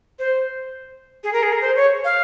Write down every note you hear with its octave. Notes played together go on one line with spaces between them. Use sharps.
C5
G#4
A#4
G#4
A#4
C5
C#5
F5